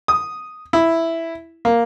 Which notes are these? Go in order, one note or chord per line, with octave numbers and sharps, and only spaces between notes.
D#6
E4
A#3